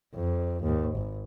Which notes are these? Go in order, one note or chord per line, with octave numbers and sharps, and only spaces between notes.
F2
D#2 G#2
G#1